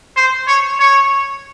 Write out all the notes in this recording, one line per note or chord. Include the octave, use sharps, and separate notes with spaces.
C5
C#5
C#5